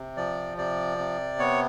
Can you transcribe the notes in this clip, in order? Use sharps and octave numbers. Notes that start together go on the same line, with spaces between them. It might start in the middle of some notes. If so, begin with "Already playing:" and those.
Already playing: C3
F3 D5
C3 D5
C3
B3 C#5